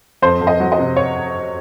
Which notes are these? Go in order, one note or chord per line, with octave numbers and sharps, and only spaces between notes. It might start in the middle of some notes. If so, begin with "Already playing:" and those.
F2 C5
F2
D#5
F#3
D#5
C3
C#5